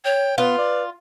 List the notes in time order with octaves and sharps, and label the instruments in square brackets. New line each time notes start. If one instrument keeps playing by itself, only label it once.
[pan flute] C#5 [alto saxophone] G5
[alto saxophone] B3 [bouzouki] F4 [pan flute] B4
[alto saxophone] D5